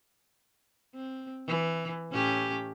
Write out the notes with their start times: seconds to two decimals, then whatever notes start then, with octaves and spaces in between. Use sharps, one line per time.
0.95 C4
1.47 E3
2.12 A2 C#4 G4